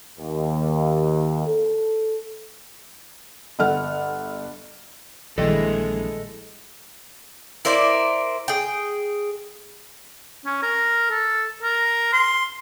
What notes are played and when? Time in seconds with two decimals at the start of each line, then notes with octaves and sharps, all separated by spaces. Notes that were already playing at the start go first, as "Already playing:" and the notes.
0.17 D#2
1.46 A4
3.59 G1 A4 F#5 F6
5.38 A#1 D#3 E3 G3 G#3 A4 D#5
7.65 E4 A#4 C5 D5
8.48 G#4 G5
10.46 C#4
10.63 A#4
11.10 A4
11.63 A#4
12.13 C6